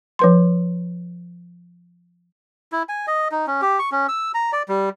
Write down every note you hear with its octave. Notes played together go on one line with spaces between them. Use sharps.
F3 B4 C6
E4
G#5
D#5
D#4
C#4
G4
C#6
C#4
E6
A#5
D5
G3